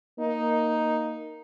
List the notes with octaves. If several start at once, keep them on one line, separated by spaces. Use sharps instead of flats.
A#3 D#4